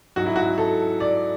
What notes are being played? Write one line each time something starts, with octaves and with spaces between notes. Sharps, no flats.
G#2 F#3 F#4
E4
F#4
A4
D5